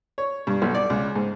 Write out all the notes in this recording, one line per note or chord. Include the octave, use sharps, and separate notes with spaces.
C#5
G2
B1
D5
C#2
G#2